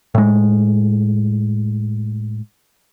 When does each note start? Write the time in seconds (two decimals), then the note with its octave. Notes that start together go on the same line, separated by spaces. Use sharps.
0.15 A2 G#3